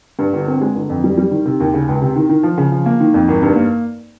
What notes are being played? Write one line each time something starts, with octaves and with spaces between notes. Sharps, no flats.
G2
G1
C4
G#3
G1
F2
G3
G3
D#3
C3
D#2
C#3
C#2
C3
D#3
D#3
F3
C#3
F3
A#3
D#3
F2
G#1
G2
A#3